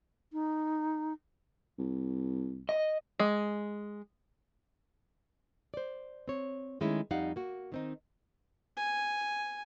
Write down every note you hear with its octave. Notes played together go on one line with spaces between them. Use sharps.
D#4
C2
D#5
G#3
C5 D5
C4 C#5
D#3 G#3 A3 C#4 E4
F2 G3 D#4 F5 F#5
A#3 F#4
D#3 C4 D#4
G#5